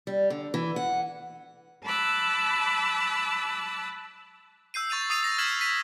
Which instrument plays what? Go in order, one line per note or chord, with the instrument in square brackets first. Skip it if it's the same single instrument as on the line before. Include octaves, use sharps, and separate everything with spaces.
[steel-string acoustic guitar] G3
D3
E3
F#5
[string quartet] A5 B5 D6 E6 F#6
[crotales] E6 G6 C7 D#7
C#6 A6 D#7 F7
D#6 A6 C7 D#7
D#6 A#6
F6 G#6 B6 E7 F#7
B6 D#7